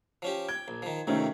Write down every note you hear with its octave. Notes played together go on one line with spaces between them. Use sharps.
F3 C#4 G4
G5 G#6
A#1
D#3 F3
F2 C3 D#3 A3 C#4 D#4